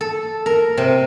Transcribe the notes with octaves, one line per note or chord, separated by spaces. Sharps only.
A4
A#4
C3